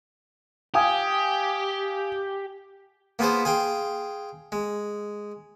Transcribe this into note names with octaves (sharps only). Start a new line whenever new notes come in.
G4 F5 G#5 D#6
A#3 B3 F4 G#4 B4 C5
G#4 F5 G5 C6
G#3